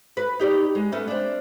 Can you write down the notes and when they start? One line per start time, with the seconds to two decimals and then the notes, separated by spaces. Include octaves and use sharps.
0.17 B4
0.40 D#4 G4 D5
0.75 G#3
0.92 A3 B3 C#4
1.08 C4 D4